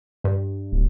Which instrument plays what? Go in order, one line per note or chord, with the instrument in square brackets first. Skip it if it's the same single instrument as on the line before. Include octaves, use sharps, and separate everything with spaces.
[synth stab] G2
[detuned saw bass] D1